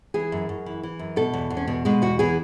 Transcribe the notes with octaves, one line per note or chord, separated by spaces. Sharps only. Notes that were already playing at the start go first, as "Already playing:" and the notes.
E3 G#4
F#2
F#2
E3
E3
F#2
B2 A4
E2
E2
C#4
B2 B3
B2 G#3
E2 F#4
E3 G#4